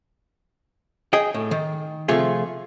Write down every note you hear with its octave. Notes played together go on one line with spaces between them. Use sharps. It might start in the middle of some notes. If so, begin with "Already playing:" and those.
G#4 D#5 G5
A2
D#3
C3 F3 A3 F4 G#4